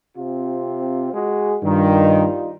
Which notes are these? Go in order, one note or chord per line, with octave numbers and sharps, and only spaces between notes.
C3 C4 F4
G#3 F#4 G#4
G2 D#3 G3 D#4 F4